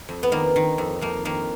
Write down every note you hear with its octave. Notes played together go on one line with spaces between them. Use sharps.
F2
B3
D#3 A#3
D#3
F2
F2 A#3
D#3 A#3